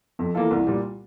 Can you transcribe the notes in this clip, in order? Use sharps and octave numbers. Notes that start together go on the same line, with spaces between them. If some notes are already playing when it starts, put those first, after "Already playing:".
F2
E3 A#3 F4 A4
C2
A#2 G3